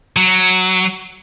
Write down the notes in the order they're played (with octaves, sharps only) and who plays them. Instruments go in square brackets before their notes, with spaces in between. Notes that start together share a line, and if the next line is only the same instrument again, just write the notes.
[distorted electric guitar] F#3